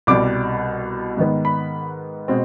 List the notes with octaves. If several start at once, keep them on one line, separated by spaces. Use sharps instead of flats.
C2 B2 G3 D6
G#2 D#3 B3
B5
B2 G#3 C4